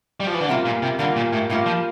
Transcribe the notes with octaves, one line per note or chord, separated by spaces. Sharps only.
G3
F3
E3
D3
C3 G3 A#3 F4
A#2
C3
D3 G3 A#3 F4
A#2
A2
A2 G3 A#3 F4
F3